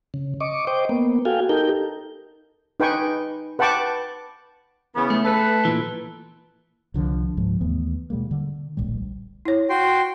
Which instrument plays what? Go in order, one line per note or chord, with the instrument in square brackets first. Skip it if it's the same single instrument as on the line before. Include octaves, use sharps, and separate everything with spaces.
[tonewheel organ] C#3
D#5 C#6 D6
C5 D#5 G5 D6
A#3 B3
F#4 A4 F5 G5 G#5
D#4 G4 A4 A#4 G6
[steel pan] D#4 B4 G5 G#5 C#6
B4 F#5 G5 A5 C#6 D6
[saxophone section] C#3 E3 B3
[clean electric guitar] A3
[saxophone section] A4 B4
[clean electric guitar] A#2 E3
[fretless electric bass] C2 D3 D#3 F3
C#2 G#2 F3
D#2 E3 A3 B3
B2 G3 G#3 A#3
D3
D1 A#1 A2 G3
[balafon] E4 C#5
[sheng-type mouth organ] F#4 G5 C6